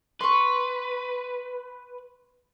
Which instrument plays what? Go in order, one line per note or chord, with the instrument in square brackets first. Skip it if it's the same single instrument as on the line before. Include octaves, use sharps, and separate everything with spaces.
[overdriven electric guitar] B4 [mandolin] C6 C#6